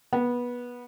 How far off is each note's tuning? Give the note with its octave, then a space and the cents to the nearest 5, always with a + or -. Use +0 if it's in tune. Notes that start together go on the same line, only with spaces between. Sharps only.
B3 -20